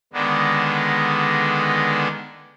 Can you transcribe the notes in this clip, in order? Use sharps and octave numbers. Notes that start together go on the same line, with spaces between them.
D3 D#3 G#3 B3 D4